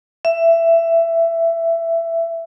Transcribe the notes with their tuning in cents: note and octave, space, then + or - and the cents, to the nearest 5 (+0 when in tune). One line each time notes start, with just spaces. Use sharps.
E5 +15